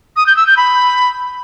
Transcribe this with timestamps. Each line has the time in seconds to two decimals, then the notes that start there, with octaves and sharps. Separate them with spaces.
0.16 D#6
0.27 G6
0.37 E6
0.47 G6
0.57 B5